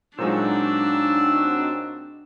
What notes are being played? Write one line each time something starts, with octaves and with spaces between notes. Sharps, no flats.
A#2 F#3 G#3 C4 D4 D#4 F#4 E6